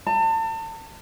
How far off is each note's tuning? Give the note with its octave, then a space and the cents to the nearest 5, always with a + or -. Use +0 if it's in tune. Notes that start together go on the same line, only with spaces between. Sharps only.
A5 +35